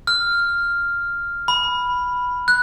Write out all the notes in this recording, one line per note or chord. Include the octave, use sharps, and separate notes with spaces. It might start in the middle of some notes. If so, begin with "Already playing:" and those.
F6
B5
F#6